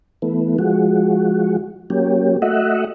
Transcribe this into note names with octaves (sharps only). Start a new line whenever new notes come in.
E3 A3 B3
F3 G#3 F#4
F#3 A#3 C#4 G4
A3 F#4 D#5 E5 F#5